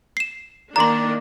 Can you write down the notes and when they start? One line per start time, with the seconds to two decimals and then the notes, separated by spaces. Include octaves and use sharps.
0.17 C7 E7
0.76 D#3 A#3 D4 D5 A#5 C6